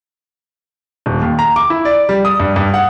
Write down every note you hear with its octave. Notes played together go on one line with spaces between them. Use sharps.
D#1
D#2
A#5
D6
E4
D5
G3
D#6
G2
G2
F#5